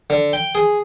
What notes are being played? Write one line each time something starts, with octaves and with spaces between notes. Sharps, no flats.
D3
G5
G#4